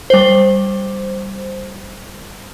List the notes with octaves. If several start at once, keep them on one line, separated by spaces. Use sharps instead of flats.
G3 C5